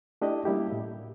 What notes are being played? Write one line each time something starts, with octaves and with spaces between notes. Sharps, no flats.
A3 D4 E4 G4 D5 D#5
G3 A#3 C#4 E4 F#4 G4
A2